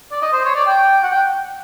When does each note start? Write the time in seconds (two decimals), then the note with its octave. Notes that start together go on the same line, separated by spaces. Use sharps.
0.11 D5
0.22 D#5
0.33 C5
0.45 C#5
0.56 D5
0.66 G5
1.03 F#5
1.11 G5